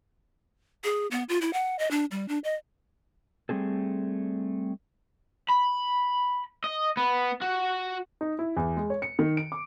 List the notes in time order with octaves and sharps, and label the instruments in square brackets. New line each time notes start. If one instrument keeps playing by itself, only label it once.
[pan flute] G#4
B3
F4
E4
F#5
D#5
D4
G3
D4
D#5
[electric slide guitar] G3 A3 C4 G#4 A4
[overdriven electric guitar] B5
D#5
B3
F#4
[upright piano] D#4
E4
E2
G#3
C#5
C#7
D#3
D7
D6